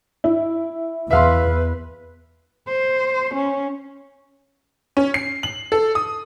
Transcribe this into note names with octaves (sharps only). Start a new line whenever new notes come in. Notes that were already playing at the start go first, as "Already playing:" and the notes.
E4
E2 B4 E5 F5 C6
C5
C#4
C#4
C7
F#7
A4
D#6